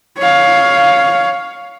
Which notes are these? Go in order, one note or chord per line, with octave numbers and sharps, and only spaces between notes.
C#5 F5